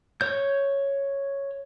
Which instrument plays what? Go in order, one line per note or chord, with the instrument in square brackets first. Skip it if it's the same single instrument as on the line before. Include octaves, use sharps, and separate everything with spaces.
[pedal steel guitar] C#5 G6